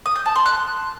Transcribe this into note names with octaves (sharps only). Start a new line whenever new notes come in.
D#6
G6
A5
C6
F#6